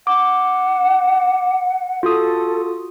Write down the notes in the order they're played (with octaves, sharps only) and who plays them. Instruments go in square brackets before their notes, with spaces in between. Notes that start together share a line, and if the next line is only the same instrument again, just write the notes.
[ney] F#5 [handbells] D6
[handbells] F4 F#4 D#6 [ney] A4